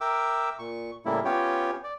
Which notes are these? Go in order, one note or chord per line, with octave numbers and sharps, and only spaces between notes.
A#4 E5 G5 D6 E6
A#2 C#6
A2 C#3 G3 A#3 E4
B3 C#4 F4 G4 C#5 G5
D5